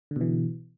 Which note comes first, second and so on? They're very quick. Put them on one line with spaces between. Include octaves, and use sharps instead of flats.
D3 B2 E3